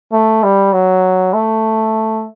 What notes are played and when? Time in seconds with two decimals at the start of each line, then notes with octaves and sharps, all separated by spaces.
0.12 A3
0.43 G3
0.73 F#3
1.34 A3